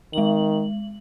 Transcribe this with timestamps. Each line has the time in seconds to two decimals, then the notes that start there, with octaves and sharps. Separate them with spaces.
0.13 D#3 G#3 F#7